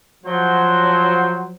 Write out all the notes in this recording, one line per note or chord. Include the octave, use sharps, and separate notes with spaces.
F3 F#3 C5